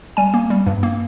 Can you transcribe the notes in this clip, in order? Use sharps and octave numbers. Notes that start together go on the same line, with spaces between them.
G3 G#5
A#3
G3
G2
A#3